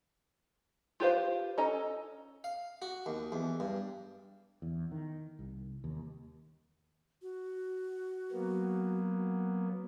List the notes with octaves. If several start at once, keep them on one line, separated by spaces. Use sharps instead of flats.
F4 G4 B4 C5 F5
C#4 A4 D#5 A#5
F5
F#4
D#2
E2
G2
E2
D#3
C2
D#2
F#4
F#3 A#3 B3